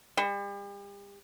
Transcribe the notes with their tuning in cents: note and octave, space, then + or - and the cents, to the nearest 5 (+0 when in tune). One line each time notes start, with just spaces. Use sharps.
G3 +40